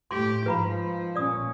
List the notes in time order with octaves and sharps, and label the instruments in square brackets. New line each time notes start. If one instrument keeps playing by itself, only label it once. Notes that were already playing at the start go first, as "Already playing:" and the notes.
[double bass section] A2 [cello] G4 [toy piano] C6
[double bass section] G#2 [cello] F3 [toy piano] B4 A#5 B5
[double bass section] A#2 C#4 [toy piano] D5 D#6